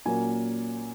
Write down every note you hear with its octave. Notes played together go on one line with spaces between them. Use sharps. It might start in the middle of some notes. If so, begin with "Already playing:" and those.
A#2 F#3 A#3 C#4 G#5